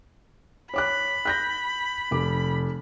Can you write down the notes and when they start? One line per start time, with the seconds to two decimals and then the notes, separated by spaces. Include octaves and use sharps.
0.74 C#5 B5 D6 F#6
1.25 F#6 G6 A#6
2.11 F1 D6